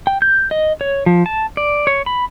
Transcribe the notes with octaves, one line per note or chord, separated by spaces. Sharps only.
G5
G6
D#5
C#5
F3
A5
D5
C#5
B5